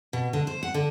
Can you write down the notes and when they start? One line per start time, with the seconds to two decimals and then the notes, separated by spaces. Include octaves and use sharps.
0.13 B2
0.33 D3
0.47 C5
0.63 F#5
0.74 D3